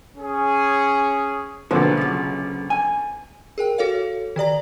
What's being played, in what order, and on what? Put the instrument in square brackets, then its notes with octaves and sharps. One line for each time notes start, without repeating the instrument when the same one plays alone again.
[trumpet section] C#4 G#4
[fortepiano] B1 D3 F3 [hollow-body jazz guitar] F#3 A#3
[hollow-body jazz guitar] F#2 C#3
G#5
[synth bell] G#4 A#4 G5
F#4 A4 C#5 F5
D#3 G4 D5 A#5